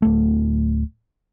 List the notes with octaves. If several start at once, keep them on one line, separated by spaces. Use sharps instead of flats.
D1 A3